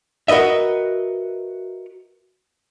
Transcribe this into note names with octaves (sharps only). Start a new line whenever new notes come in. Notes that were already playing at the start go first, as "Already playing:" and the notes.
F#4 A#4 B4 D#5 E5